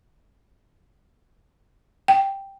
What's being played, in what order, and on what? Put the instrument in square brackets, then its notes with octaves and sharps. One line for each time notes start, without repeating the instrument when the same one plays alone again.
[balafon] G5